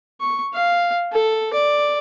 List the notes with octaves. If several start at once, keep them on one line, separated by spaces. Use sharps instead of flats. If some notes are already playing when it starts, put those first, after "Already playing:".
C#6
F5
A4
D5